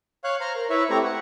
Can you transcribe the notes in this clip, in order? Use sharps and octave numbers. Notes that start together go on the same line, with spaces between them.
C#5 F5 F#6
C5 A#5 F6
A#4
E4 B4 C#5 E5
A3 C4 E4 G4 C#5 A#5
F#5